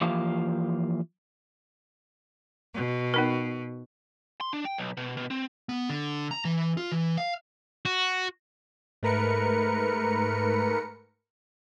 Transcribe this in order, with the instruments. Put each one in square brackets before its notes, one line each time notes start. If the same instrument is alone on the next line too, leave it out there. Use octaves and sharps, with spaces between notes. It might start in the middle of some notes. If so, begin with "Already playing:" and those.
[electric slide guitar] E3 F3 A#3 F4 G4 F5
[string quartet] B2
[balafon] B3 D#4 A#4
[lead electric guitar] C6
D4
G5
B1
B2
B2
C4
B3
D3
A#5
E3
F4
E3
F5
[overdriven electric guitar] F#4
[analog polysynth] G#2 A3 A#4 B4 C#7